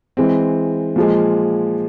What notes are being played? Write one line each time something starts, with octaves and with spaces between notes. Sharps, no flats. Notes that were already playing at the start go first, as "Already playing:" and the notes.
E3 G#3 C4
A#2 F3 G#3